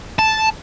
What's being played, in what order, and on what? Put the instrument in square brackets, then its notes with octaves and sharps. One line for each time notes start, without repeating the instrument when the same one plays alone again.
[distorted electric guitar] A5